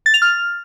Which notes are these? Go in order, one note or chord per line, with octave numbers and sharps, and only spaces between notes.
A6
F7
F6